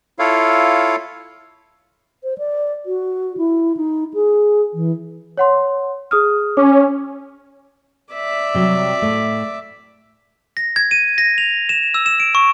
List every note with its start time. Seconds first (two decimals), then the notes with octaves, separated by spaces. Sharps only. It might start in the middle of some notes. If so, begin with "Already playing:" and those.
0.19 E4 F4 A4 C#5 F5
2.24 C5
2.38 D5
2.86 F#4
3.37 E4
3.77 D#4
4.14 G#4
4.74 E3
5.38 C#5 F#5 C6
6.11 G#4 D#6 F6
6.57 C#4 D6
8.13 D5 E5
8.54 C3 F#3 G3
9.02 A2 A3
10.57 A#6
10.76 G#6
10.91 D#7
11.18 A#6
11.38 F7
11.69 E7
11.94 E6
12.06 E7
12.20 D7
12.35 C#6